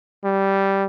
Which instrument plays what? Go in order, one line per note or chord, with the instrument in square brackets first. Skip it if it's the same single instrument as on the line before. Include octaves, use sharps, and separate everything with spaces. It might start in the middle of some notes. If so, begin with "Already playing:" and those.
[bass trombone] G3